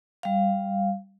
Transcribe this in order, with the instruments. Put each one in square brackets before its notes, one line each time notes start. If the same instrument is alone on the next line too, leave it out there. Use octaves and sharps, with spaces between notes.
[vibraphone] G3 F5